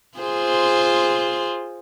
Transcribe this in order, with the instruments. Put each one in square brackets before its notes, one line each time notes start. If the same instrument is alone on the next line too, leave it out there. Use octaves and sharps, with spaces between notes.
[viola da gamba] F4 G#4 C5